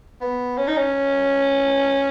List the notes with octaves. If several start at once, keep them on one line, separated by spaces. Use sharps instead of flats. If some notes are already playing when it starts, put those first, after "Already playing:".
B3
C#4
D#4
C#4